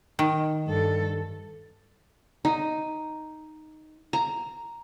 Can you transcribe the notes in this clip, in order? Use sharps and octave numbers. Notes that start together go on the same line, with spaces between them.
D#3
G2 A4
D#4
A#5